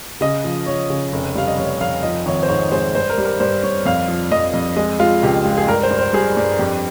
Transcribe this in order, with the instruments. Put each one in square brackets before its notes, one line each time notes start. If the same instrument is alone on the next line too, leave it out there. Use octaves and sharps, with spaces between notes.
[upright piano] C#3 D#5
F3
F3 C#5
C#3
F1
G3 F5
D#5
F1 C#5
F1 F5
F3 D#5
G#1 C#5
C5
G#2 C#5
G#3 C5
G2 C5
A#4
G3
A#4
G2 C5
G2 C#5
F2 F5
F3
F2 D#5
F2
G#3 D#5
G#3 F4
C#2 G4
G#3
G#4
G2 A#4
C5
G2
C5
G3 G#4
G2
F2 G4